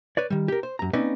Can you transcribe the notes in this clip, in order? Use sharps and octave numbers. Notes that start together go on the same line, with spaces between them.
B4 C#5 D5
D#3 G3
G4 A#4
C5
F#2 A#5
A#3 C4 C#4 D#4 B4 D5